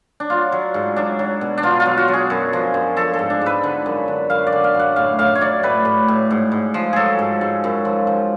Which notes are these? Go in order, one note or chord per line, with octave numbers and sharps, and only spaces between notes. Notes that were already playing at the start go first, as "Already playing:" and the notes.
D4
F#3 F4
F#3
G#2
F#3 D4
F#3
B2
D4
B2 F4
F4
F#3
F#4
F#3
G#4
F#2
F3
F#2
F3 A4
A4
G#2
D4
G#2 B4
D3
F#2
D3
F#2 F5
D5
D3
F5
F#2
F#5
A2 F5
A2 F5
C#5
F#3 D5
A2 B4
A2
A2
G#2
G#2
F3
F#3 G#4 A4
G#2
G#2
F#2
F3
F3